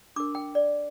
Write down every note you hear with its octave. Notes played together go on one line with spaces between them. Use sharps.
D4 A#4 D6
G5
D5